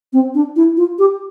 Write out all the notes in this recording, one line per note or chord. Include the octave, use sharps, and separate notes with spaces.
C4
D4
E4
F4
G4